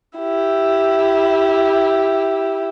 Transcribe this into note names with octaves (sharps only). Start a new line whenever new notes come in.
E4 G4